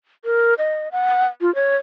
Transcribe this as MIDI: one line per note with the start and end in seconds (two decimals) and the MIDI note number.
0.25 0.54 70
0.58 0.88 75
0.92 1.26 78
1.41 1.53 65
1.55 1.76 73